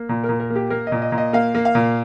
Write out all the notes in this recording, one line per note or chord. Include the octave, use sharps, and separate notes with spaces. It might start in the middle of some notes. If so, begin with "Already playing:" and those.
Already playing: A#3
A#2
A#4
A#2
A#4
A#3
G4
A#3 A#4
D#5
A#2
D#5
A#2
D#5
A#3 F5
A#3
F5
A#2